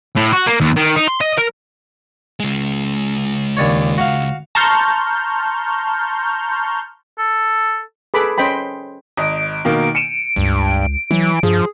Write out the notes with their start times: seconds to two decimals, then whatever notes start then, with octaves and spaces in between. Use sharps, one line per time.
0.16 A2
0.33 F#4
0.47 A#3
0.60 D#2
0.76 D#3
0.96 D#4
1.07 C6
1.21 D#5
1.38 A#4
2.40 C#2 G#3
3.57 D#2 D4 C#5
3.98 F#4 F5
4.55 A5 A#5 C6 C#6 F6 G6
7.18 A4
8.14 G#4 A4 B4 B5 D6
8.38 C#4 C5 D#5 G5 B5
9.17 G#1 D#5 D7
9.65 B2 D#3 A#3
9.95 C#7 D#7 E7
10.36 C#2 G2
11.11 E3 F#3
11.43 G2 F3 G#4